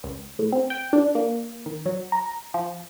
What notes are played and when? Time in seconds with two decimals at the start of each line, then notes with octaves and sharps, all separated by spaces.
0.04 C#2
0.39 A2
0.52 C4
0.70 G5
0.93 D4
1.15 A#3
1.66 D#3
1.86 F#3
2.12 A#5
2.54 F3